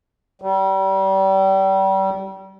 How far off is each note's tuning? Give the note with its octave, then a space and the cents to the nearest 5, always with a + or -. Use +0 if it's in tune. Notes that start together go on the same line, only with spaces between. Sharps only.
G3 -30